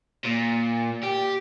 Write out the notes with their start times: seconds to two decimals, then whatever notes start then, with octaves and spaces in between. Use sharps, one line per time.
0.25 A#2
1.04 G4